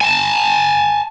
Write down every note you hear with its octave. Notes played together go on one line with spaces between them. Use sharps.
G#5 A5